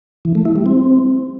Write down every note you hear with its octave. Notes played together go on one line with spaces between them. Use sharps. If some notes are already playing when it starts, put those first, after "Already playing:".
E3
A3
E4
G3
C4